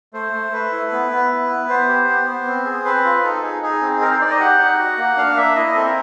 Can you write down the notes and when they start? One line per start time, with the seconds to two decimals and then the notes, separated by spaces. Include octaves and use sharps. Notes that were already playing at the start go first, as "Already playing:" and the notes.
0.13 A3 C5
0.33 A3
0.52 A3 B4
0.72 E4
0.92 B3
1.11 B3
1.31 E4
1.49 B3
1.68 B3 C5
1.88 G4
2.07 B3
2.27 B3
2.47 C4
2.65 G#4
2.85 C4 B4
3.05 F4
3.23 D#4 A4
3.42 D#4 G#4
3.62 D#4 G#4
3.82 C4
4.01 D#4 A#4
4.11 C5
4.21 D#4 D5
4.30 D#5
4.39 G4 F#5
4.59 D#4
4.78 F#4
4.97 A#3
5.17 D4 F5
5.36 A#3 E5
5.55 E4 D#5
5.66 D#5
5.75 C4 A4
5.85 A#4